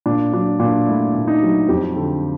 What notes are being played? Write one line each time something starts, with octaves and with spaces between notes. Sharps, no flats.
A#2 D4
F#3 D4
A#2 D4
A3 E4
A#2
D#4
F#3
F2 G4
D3 A4